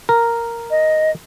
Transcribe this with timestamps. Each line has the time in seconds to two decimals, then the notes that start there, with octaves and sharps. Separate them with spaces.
0.09 A#4
0.71 D#5